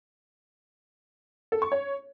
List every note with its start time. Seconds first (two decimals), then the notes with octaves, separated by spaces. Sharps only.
1.52 A4
1.62 C#6
1.72 C#5